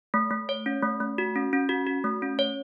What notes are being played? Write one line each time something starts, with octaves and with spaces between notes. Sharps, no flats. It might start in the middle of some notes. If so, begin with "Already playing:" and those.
A3
A3
C#5
C#4
A3
A3
F#4
C#4
C#4
F#4
F#4
A3
C#4
C#5